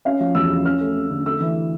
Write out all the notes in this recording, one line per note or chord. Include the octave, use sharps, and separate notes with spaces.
C#4 F5
F3
E2 E6
C#3
C#4 F6
A3
F2
D3
A3 E6
E3